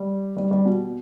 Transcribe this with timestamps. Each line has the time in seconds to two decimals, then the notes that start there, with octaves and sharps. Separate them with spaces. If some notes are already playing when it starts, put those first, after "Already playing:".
Already playing: G3
0.37 G3
0.51 G3
0.65 B2